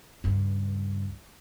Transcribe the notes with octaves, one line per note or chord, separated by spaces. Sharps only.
C#2 G2